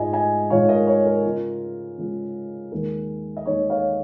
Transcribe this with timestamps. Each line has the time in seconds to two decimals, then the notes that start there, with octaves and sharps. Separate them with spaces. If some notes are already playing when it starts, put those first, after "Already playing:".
Already playing: G#2 G#3 F4 D#5 G#5
0.13 D#5 G#5
0.50 G#2 G#3 F4 C#5 F5
0.69 A#4 D#5
0.87 C#5
1.06 A#4
1.25 C#3 G#3 F4
1.98 C#3 G#3 F4
2.72 D#2 D#3 G#3 A#4
3.37 D#5
3.46 D#2 D#3 G#3 C#5
3.70 C#5 F5